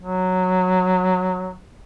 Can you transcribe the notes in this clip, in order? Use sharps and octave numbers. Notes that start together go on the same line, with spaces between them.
F#3